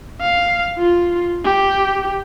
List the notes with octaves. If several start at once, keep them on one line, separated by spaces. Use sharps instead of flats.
F5
F4
G4